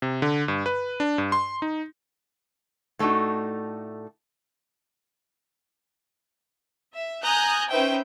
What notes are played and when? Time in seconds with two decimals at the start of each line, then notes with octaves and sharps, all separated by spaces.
0.02 C3
0.22 D3
0.48 G2
0.66 B4
1.00 D4
1.18 G2
1.32 C6
1.62 D#4
2.99 A2 A3 D4 D#4 F#4
6.94 E5
7.23 G#5 A#5 D#6 F#6 G6
7.70 C#4 D#4 B4 C5 E5 G5